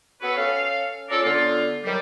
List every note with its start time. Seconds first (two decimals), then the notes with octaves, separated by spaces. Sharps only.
0.22 B3 F#4 A4 B4 C#5
0.37 C#4 A4 F5
1.10 C#4 F4 A4 A#4 D5
1.24 D3 B3 F4
1.84 D#3 F#3 G3